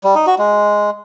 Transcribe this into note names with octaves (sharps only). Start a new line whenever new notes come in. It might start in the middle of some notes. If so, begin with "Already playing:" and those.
G3
D#4
F#4
G#3